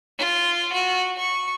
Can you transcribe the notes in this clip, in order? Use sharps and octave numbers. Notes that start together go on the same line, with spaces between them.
F4
F#4
C#6